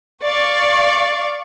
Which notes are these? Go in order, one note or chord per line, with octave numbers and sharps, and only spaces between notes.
D5 F5 C#6